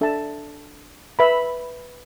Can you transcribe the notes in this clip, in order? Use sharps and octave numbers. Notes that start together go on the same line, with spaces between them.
D4 A4 E5 A5
B4 E5 B5